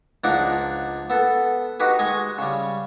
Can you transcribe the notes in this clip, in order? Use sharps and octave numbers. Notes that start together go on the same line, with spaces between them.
C#2 F3 D4 D#4 F#5 D6
B3 A4
D#4 F#4 G4 B4
G#3 D#5 C#6
C#3 G3